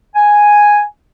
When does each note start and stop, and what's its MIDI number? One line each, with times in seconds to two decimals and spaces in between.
0.15 0.82 80